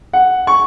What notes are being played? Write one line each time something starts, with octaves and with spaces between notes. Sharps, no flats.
F#5
C#6